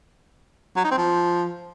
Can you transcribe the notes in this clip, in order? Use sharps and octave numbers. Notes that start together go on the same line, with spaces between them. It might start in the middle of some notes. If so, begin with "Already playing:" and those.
F#3
D#4
C4
F3